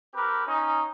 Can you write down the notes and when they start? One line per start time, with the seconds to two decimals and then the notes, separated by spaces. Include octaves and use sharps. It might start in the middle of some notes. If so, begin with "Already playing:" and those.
0.14 C4 G4 A#4 B4
0.47 C#4 D#4